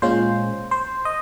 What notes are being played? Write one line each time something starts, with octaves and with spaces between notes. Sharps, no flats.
A#2 G#3 C#4 F4 C5
C5
D#5